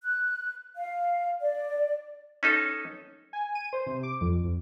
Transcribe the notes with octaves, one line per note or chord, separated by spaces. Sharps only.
F#6
F5
D5
C#4 D#4 A4
G#5
D#7
C5
C3
D6
F2
F2